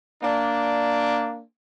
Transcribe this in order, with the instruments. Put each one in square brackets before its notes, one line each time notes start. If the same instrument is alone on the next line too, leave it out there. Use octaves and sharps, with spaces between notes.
[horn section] A#3 D4